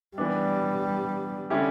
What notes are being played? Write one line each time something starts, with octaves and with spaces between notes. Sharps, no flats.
E3 G3 B3 D4
D3 G3 C#4 E4 G4